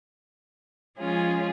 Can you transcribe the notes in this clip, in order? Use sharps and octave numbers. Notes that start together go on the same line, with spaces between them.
F3 G#3 C#4 F4 G#4